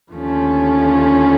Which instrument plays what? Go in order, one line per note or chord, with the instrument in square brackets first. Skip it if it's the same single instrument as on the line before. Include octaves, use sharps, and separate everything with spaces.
[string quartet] D#2 D3 F3 A3 C#4